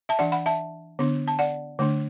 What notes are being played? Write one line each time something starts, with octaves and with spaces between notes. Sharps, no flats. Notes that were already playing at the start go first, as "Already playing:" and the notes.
E5 A5
E3 D4 D5 F#5
F#5 B5
E5 A5
D3 B3 D4
A5
D5 F#5
D3 A3 D4